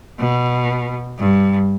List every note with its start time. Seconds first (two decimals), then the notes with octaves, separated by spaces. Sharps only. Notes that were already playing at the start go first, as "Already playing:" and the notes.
0.19 B2
1.18 G2